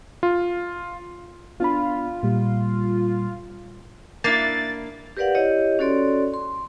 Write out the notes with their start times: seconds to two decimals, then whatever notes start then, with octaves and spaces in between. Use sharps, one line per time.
0.23 F4
1.60 B3 D4 F4 B5
2.23 A#2 G3
4.24 A#3 D4 E4 A6
5.17 G4 A#4 B4 D5 F5 F#5
5.35 E4 G4 C#5 D#5
5.79 C#4 F#4 A4 C#5 D5 C6
6.34 C6